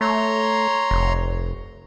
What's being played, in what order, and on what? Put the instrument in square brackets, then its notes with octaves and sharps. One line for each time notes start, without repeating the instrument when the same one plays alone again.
[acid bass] A3 [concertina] C#5 A#5 C6
[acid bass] F1